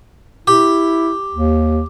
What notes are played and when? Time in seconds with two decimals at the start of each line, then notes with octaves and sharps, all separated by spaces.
0.47 E4 G4
1.34 D#2